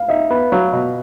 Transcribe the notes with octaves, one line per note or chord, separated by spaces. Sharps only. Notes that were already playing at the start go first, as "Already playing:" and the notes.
Already playing: F5
D#4 E5
B3
F#3 F5
B2